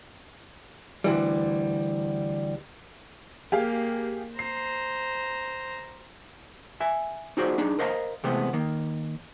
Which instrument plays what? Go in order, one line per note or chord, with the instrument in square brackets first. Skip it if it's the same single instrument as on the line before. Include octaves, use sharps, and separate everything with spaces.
[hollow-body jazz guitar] D2 E3 G3
[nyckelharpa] A#3 [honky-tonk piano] G4 G#4 F5
[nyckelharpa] C5 A#5 [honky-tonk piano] C7
[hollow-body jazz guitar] E5 G#5
D#4 F4 F#4 G#4 C5 D5
D4 D#4 G#4
A#4 C5 D#5 F5 A5 A#5
C3 E3 G#3 A3 B3 C5
D#3 A#3